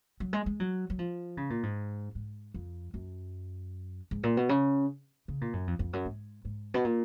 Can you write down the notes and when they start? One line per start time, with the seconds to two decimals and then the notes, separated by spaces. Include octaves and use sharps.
0.20 F#3
0.33 G#3
0.46 G#3
0.60 F#3
0.90 F#3
0.99 F3
1.37 C#3
1.50 A#2
1.63 G#2
2.15 G#2
2.54 F2
2.94 F#2
4.11 G#2
4.23 A#2
4.37 B2
4.49 C#3
5.28 C#3
5.41 A#2
5.53 F#2
5.67 F2
5.79 F2
5.93 F#2
6.05 G#2
6.45 G#2
6.74 B2
6.84 A#2